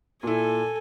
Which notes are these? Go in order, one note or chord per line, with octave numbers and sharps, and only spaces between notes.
A#2 E4 A4 G#5